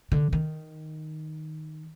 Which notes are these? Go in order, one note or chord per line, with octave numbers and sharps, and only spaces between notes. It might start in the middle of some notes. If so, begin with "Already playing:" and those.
D3
D#3